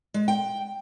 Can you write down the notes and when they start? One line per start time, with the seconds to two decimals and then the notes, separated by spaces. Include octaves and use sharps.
0.14 G#3
0.28 G5